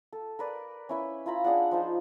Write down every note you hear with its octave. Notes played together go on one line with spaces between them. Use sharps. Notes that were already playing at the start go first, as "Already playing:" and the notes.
A4
A#4 B4 D5
C#4 E4 B4
E4 F4 A#5 B5
D4 G#4 D5 F#5
F3 D#4 F4 C5